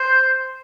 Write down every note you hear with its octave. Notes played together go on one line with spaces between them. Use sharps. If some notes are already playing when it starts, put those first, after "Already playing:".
Already playing: C5